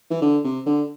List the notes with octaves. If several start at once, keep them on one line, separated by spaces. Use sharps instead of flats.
E3
D3
C3
D3